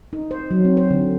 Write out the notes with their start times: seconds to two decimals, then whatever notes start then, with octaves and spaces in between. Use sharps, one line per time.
0.13 D#4
0.31 C5
0.51 F#3
0.65 C4
0.77 C5
0.90 D3